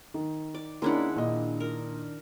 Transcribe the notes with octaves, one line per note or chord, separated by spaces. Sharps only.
D#3
D5
D#3 G#3 A#3 C#4 D4 E4 F#5
A#2 D#5
A#4